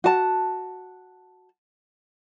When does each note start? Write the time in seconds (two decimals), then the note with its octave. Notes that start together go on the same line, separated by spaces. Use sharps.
0.04 F#4 A5